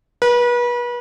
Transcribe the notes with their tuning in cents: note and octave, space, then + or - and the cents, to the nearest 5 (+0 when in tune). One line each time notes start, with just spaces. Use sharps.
B4 -35